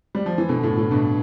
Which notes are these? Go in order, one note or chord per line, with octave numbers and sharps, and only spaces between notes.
G3
F3
E3
B2 D3
A2
A2
G2 B2